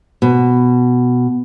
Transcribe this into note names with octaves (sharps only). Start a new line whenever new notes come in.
B2